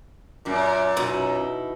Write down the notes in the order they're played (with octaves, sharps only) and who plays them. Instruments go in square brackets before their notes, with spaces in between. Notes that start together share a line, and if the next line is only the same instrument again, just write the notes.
[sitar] F#2 A#2
[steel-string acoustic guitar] B2 D#4 E4